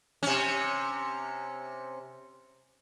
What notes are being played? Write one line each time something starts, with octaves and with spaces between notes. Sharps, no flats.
C3 C#4